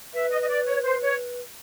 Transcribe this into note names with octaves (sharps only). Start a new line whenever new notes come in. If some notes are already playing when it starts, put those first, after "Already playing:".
B4 E5
D#5
D#5
D5
C#5
C5
C#5